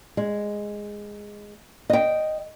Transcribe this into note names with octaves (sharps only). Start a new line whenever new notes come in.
G#3
D#5 G5